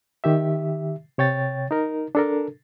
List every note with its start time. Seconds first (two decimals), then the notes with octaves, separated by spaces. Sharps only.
0.24 D#3 G4 E5
1.18 C3 C#5 G5 A6
1.71 D#4 A#4
2.15 D4 A4 A#4